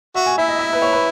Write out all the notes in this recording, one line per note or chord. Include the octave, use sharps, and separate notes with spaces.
F#4 E5
G#5
E4 E5
D#5
E5
B4
C#5
B4